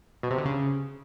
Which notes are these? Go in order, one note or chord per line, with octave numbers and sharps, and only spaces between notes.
B2
C3
D3
C#3